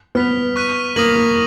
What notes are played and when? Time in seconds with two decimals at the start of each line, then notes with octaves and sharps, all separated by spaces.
0.15 B3 F6 B6 F7
0.56 C#6 F#6 B6 D#7
0.96 A#3 D#6 A#6 D#7 F#7
1.16 A#3